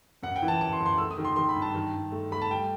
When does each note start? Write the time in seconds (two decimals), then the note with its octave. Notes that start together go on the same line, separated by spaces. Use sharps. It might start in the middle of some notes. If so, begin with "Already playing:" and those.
0.23 F#2 F#5
0.36 G5
0.42 E3
0.48 A5
0.61 F#2 A5
0.73 C6
0.80 F#2
0.86 C6
0.98 A3 E6
1.11 D#6
1.18 D#3
1.25 C6
1.36 D#3 C6
1.49 B5
1.56 G2
1.62 A5
1.75 D#3
1.94 G2
2.12 A3
2.31 A3 B5
2.42 A5
2.50 G3 G5